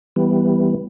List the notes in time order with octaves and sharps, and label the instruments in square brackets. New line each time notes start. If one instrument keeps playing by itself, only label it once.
[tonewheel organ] E3 G3 B3